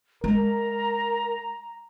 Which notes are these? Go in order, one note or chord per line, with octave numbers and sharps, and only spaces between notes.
G#3 A#4 A#5